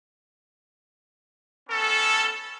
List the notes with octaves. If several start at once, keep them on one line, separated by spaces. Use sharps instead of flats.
B3 C#4 A4